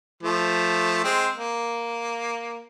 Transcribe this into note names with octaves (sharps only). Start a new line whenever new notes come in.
F3 A3
G#3 C4
A#3